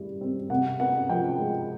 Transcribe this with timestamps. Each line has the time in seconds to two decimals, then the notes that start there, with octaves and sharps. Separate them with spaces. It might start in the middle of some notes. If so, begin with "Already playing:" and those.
Already playing: G3 E4
0.21 C4
0.50 C3 F#5
0.80 B3 F#5
1.09 F3 G5
1.39 G#3